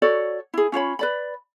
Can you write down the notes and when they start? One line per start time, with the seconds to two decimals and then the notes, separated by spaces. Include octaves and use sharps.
0.02 F#4 A4 C#5 D5
0.54 E4 G#4
0.72 C#4 F4 C#5 B5
0.99 B4 D5 B5